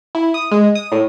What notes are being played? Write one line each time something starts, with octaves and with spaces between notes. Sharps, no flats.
E4
D#6
G#3
D#6
A2